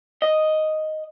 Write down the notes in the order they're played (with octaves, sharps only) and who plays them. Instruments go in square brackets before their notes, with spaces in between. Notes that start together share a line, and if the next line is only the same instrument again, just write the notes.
[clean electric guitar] D#5